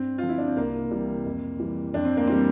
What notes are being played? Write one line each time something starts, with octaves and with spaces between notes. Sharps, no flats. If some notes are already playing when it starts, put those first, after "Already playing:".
Already playing: G2 C4
F4
D3 F3
E4
D4
C4
C2 A#3
C3 E3 G3
F2
E3 G3
F2 D4
C4
A#3
E3 G3 C4